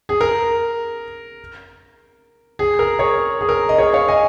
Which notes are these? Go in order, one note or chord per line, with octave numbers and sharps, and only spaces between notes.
G#4
A#4
G#4
A#4
G#4 C#5
G#4
A#4
D#5
G#4 C#5
C#5 F5
D#5 G#5